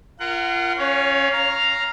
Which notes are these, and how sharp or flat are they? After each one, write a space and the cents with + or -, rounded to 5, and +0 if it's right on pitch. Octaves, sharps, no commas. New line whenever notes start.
F4 -25 A#4 -10 F#5 +20
C#4 -10 C#5 +25 F5 +0
F5 +0 A#5 +0